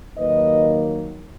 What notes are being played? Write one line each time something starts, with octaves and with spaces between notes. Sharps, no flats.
D#2 D#3 F#3 A#3 D#4 B4 D#5